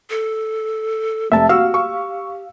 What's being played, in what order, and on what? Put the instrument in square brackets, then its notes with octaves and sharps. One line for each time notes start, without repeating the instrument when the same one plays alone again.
[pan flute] A4
[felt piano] F1 [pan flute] G#3 [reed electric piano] E5 A5
[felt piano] F#4 E6 [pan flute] G4 [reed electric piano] F5
[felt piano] C#6